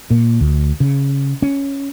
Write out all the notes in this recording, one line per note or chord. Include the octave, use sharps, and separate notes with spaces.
A#2
D2
C#3
C#4